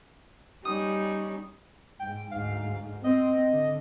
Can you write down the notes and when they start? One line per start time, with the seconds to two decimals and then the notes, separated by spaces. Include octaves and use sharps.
0.65 G3 C#4 D#4 D#6
1.99 G#2 G5
2.31 D2 G#2 F5
3.04 C4 D#5
3.50 D3